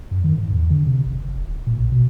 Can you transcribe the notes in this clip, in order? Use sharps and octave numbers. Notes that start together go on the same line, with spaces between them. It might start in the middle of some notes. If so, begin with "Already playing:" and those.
F#2
D#3
G#2
E2
D3
C3
G1
F#1
D1
A#2
A#1
B2